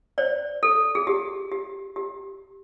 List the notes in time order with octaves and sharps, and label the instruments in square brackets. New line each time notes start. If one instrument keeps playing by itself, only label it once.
[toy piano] C5 D5
A4
G#4
G4
G4
G4